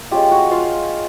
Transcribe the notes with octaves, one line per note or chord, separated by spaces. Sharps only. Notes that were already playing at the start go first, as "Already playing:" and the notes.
Already playing: A#3
G#3 C#4 F4 G4 G5
F#4 F#5
F4 F5